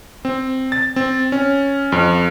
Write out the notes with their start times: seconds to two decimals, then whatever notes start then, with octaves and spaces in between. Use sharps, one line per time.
0.25 C4
0.72 A6
0.96 C4
1.32 C#4
1.92 F2